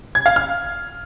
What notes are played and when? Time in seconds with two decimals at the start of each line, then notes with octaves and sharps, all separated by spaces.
0.15 G#6
0.26 F5
0.36 F6